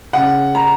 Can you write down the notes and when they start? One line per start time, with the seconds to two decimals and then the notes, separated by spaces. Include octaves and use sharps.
0.13 C#3 F#5
0.55 A#5